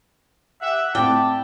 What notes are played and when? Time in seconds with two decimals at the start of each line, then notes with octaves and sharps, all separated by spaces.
0.61 G4 E5 F#5
0.95 A2 C4 E4 G4 D5 G5 A5